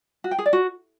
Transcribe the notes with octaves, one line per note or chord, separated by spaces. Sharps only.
F#4
G5
G#4
D5
F#4